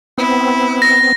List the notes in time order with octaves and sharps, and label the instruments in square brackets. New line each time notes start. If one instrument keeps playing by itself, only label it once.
[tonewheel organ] B3 C4 [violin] E4
[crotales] A#6